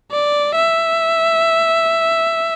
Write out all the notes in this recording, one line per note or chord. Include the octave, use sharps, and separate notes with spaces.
D5
E5